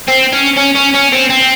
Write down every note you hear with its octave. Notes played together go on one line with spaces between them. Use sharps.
C4
C#4
C#4
C#4
C#4
C4
C4